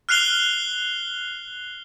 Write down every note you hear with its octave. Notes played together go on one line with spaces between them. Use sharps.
F6 F#6 C7 F7 G7